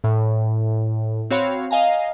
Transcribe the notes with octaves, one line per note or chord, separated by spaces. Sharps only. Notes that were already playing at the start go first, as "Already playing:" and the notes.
A2
C4 F#4 C#5 F5 B5
D#5 F5 G#5 A#5